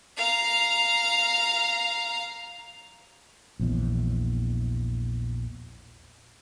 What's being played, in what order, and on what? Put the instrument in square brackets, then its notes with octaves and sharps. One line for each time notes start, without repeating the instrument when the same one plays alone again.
[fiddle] F5 A#5
[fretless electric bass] A#1 E2